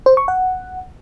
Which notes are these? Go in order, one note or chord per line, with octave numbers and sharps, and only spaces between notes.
C5
C#6
F#5